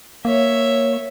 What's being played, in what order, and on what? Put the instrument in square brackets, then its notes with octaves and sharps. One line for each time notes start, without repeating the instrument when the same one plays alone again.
[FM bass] A#3 [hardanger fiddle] C#5 E5